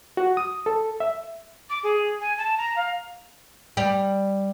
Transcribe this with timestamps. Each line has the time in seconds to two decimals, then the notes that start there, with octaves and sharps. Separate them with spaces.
0.17 F#4
0.37 D#6
0.66 A4
1.00 E5
1.70 D6
1.83 G#4
2.20 G#5
2.38 A5
2.58 A#5
2.76 F5
3.77 G3